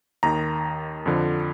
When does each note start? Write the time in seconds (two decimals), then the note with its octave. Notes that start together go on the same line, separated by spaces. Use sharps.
0.23 D#2 D#3 A#5
1.06 F2 D3 F3